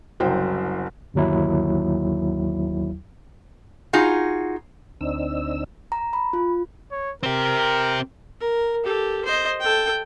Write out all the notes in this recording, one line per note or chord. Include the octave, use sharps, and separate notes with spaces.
F#1 C2 F#3 C5 G5
G1 D#2 F#3 E4
D#4 F4 F#4 G#4
D2 C4 D4 D#4 E6
A#5
B5
F4
C#5
C4 G4 A#4
A#4
G4 A4
C5 D#5
A4 G5